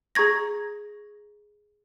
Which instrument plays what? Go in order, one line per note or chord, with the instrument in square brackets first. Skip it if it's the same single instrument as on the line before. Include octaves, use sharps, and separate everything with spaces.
[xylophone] G#4 A#5 C#6 G#6 A#6